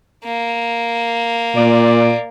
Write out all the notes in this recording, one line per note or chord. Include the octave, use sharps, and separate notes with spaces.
A#3
A#2 D5